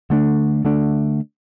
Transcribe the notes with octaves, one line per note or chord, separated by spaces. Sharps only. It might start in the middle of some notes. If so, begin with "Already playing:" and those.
D3 A3 D4
D3 A3 D4